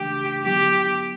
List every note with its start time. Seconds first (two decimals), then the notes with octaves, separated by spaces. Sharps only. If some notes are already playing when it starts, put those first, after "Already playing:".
Already playing: C#3 E3 A3 D4 G4
0.44 D3 F#3 B3 E4 G4